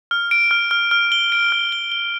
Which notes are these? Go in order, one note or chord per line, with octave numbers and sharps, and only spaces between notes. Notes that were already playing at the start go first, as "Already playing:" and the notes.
F6
D7
F6
F6
F6
G7
D7
F6
G7
G7